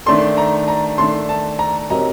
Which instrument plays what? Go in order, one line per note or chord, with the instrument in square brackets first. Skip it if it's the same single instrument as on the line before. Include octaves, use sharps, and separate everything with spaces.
[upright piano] D#3 A3 D4 A4 [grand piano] C6
[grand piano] A#5
A#5
[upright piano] D#3 A3 D4 A4 [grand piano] C6
[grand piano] A5
A#5
[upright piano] F#3 C4 G4 A#4 D#5 [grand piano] A#5